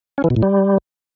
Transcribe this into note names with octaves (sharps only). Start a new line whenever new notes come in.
C#4
E3
B2
A2
G3